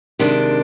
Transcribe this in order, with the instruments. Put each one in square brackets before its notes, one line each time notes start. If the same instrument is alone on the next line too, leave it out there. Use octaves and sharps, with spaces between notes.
[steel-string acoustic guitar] C3 D#3 G#3 D4